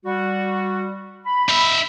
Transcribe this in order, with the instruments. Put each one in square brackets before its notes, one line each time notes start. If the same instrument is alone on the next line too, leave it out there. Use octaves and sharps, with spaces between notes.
[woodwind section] G3 F#4
B5
[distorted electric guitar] D#4 E5